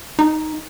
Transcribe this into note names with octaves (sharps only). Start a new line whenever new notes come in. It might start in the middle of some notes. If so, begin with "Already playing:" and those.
D#4